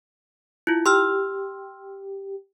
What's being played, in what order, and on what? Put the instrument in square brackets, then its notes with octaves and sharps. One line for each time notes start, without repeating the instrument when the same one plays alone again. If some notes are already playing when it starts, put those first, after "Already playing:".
[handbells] E4 F4
[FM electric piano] G4 [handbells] C6 E6 F6